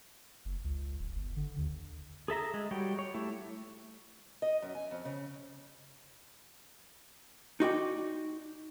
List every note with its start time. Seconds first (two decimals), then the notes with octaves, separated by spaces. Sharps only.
0.45 F#1
0.64 C#2
0.99 D1
1.15 G1
1.36 D3
1.58 D#2
2.28 G#4 A4 E5 A#5
2.54 G#3
2.71 G3 F#4 C#5 G5
2.99 C#5
3.14 A3 E4 G4
4.42 D#5
4.62 F#2
4.75 G#5
4.91 F2
5.05 C#3
7.60 D#4 F#4 D5 G5